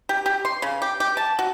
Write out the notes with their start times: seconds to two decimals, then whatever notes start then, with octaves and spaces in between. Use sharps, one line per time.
0.09 G4
0.26 G4
0.45 C6
0.62 C#3
0.82 G4
1.00 G4
1.17 A5
1.39 F#4